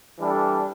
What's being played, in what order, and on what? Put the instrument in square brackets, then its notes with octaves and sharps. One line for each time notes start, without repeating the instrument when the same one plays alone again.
[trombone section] E3 G3 D4 A4